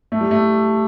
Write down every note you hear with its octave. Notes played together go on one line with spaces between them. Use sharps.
A3
G3
A3